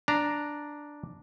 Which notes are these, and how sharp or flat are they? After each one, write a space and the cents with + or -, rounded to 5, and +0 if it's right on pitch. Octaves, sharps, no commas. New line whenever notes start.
D4 +0 A#5 +0